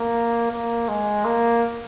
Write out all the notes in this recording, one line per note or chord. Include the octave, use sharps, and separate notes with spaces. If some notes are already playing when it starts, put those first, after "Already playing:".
Already playing: A#3
A#3
G#3
A#3